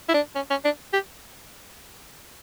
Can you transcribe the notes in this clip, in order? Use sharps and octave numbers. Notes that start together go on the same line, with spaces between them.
E4
D4
C#4
C#4
D4
G4